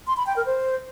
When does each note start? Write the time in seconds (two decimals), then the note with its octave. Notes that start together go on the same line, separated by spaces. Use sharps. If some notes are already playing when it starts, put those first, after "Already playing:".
0.07 C6
0.17 B5
0.27 G5
0.36 A#4
0.46 C5